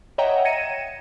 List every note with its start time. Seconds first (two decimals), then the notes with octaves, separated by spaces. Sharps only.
0.18 C#5 D#5 E5 F#5 G5 A#5
0.45 G#6 A#6 C#7 D#7 E7